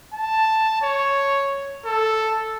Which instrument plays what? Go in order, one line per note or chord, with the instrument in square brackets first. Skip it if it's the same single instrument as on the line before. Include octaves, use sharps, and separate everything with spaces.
[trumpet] A5
C#5
A4